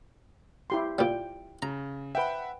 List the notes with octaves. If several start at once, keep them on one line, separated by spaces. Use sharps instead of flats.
E4 G4 C6
A#2 G3 G5
C#3 A#5
B4 E5 F#5 G5 B5